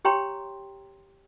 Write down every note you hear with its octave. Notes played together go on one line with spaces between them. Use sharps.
G4 C#5 G5 A#5 C6